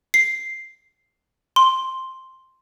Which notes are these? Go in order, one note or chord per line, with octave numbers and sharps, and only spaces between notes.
C7
C6